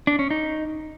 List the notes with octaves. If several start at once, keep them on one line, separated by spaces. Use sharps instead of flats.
D4
C#4
D#4